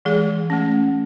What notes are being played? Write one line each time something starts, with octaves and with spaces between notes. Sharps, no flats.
E3 G#3 G#4
A3 C#4